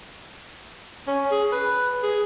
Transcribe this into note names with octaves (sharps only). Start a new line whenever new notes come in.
C#4
G#4
B4
G#4